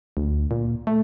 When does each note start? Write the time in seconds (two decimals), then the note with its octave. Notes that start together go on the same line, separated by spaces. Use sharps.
0.17 D2
0.51 A#2
0.87 A3